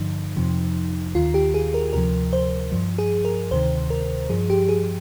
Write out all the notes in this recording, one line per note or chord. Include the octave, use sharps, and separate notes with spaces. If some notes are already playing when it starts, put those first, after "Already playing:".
Already playing: G2 D3 F3 D#4
F2 C3 F3
D#2 D#3 F4
G4
G#4
A#4
D2 C3 F3 A#4
C5
G2 F3
G#4
A#4
D2 C3 D#3 C5
A#4
G2 F3 G#4
G4
G#4